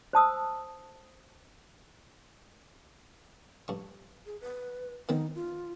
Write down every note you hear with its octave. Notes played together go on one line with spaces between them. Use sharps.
C5 A5 D#6 E6
G2 C#6
G#4
B4
D#3 B3 C4 D#4
F4